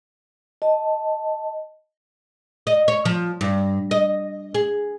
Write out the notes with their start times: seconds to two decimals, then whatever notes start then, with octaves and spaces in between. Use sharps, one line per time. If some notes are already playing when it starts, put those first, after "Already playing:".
0.62 D#5 A5
2.67 D#5
2.88 C#5
3.05 F3
3.41 G2
3.91 D#5
4.55 G#4